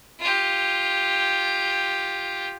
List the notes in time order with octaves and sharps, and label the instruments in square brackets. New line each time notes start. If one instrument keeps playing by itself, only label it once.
[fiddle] F4 G4